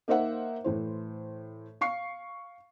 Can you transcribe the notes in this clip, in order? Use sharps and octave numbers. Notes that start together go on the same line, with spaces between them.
A#3 D#4 A#4 C5 E5 F#5
A2 E3 C5
F5 C#6 C7